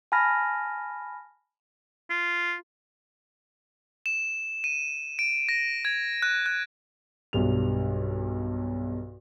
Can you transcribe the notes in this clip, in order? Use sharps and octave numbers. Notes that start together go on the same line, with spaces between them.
G#5 A5 B5 F6 A#6
F4
E7
D#7
D7
A#6
G#6
F#6
F#6
B1 G2 F7